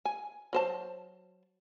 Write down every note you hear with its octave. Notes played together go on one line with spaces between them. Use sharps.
G#5
F#3 C5 A5